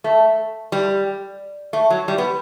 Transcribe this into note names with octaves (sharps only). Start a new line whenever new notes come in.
A3
G3
A3
F#3
G3
B3